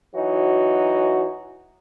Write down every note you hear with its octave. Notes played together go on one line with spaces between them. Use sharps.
E3 F#3 D#4 F#4